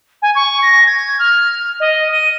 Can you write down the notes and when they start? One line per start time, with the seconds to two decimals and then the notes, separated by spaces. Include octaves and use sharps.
0.22 G#5
0.35 C#6
0.62 A#6
0.86 G#6
1.19 F6
1.80 D#5
2.11 D#7